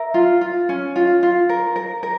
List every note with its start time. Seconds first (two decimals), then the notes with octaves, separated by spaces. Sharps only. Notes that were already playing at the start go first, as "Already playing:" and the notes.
Already playing: A#4 E5
0.14 F4
0.41 F4
0.69 C#4
0.96 F4
1.23 F4
1.49 A#4
1.76 A#4
2.03 A#4